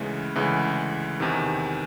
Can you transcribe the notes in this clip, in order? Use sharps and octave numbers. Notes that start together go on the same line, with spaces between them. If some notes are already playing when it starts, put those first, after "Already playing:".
Already playing: D2 C#3 E3 G#3
D2 C#3 E3 G#3
E2 C3 D#3